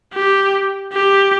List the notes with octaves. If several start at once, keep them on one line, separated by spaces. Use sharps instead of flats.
G4
G4